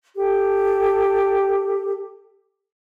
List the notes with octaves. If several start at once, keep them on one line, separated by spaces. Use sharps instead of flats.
G4 A4